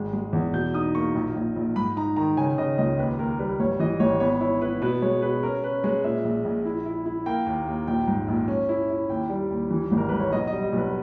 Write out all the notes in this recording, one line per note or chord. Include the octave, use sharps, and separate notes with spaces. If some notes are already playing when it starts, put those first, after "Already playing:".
Already playing: G#1 G#3
G#3
E2
B2 G6
D#4 D#6
A#3 C#6
A#1
A#1
A#1
G#2 B5
D#4 A#5
D#3 A#5
C#3 G#5
C#3 D#5
C#2 D#5
D#2 B4
D#2 A#4
G3 B4
G#1 C#5
E3 D#5
G#1 C#5
B3 C#5
E4 C#5
E4 B4
B2 B4
G#3 C#5
B2 B4
C#4 A#4
C#4 B4
G#3 C#5
A#2 E5
A#1
A#1
E4
E4
E4
A#3 G5
D#2
D#2
A#1 G5
G#2
A#1
C#4
E4
E4
D#2 G5
G3
D#2
E3
G#1
A#4
G#2 B4
C#5
B1 D#5
D#5
G3
D#5
B1 B4